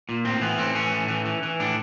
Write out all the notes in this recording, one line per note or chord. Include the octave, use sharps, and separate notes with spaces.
A#2
A2 C4
E3 B3
A2 C4
E3 C#4
A2
E3
E3
E3
A2 D4